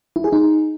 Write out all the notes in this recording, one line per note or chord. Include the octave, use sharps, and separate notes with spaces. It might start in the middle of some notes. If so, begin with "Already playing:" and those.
E4
G#4
D#4